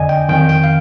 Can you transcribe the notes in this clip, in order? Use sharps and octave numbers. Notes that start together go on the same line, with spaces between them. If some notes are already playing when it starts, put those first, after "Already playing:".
Already playing: F2 D3 D5 D#5 G#5
G5
F2 D#3 G5
G5
F5